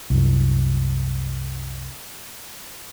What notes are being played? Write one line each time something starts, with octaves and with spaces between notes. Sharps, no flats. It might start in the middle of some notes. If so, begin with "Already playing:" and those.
C2 F#2